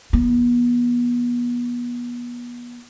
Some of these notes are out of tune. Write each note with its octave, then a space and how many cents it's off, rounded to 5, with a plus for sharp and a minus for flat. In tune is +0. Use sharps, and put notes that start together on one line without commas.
E3 +0 B3 -30